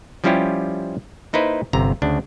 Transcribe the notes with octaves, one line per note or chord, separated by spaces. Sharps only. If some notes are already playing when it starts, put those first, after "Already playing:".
F3 G3 C#4 E4 F4 G4
A#3 D#4 E4 B4 C5
G1 C3 A#5
D2 C#3 D4